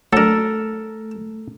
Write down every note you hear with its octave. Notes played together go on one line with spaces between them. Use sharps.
F#3 A3 D4 A4 A#4